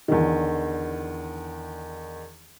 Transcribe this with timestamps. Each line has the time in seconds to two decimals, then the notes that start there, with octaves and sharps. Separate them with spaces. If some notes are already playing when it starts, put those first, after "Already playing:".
0.08 E2 D3 D#3